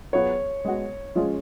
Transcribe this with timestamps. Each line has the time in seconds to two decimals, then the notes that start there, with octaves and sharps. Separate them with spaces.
0.13 F#3 B3 F4 G#4 C#5
0.65 G#3 B3 F#4
1.15 F3 G#3 C#4 F4 G#4